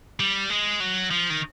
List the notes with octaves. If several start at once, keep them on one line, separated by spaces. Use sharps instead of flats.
G3
G#3
F#3
F3
D#3